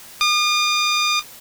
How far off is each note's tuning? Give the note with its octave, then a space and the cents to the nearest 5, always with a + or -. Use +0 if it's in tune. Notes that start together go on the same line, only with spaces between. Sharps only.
D#6 -45